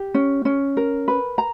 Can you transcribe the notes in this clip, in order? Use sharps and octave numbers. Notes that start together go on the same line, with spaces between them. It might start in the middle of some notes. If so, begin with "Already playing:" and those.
Already playing: G4
C#4
C#4
A#4
B4
A#5